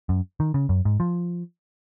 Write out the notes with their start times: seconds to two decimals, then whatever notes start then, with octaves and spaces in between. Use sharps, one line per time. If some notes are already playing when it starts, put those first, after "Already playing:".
0.09 F#2
0.40 D#3
0.54 C#3
0.69 F#2
0.85 G#2
1.00 F3